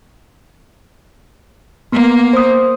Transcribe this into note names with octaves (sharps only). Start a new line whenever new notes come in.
A#3 B3
C5 D#6